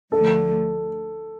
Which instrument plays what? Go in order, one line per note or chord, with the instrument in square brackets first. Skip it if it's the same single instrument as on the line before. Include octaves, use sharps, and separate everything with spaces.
[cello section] D2 D3 F3 A3 [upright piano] A4